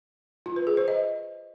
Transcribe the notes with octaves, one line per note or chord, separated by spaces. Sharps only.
F4
B4
G#4
C5
D#5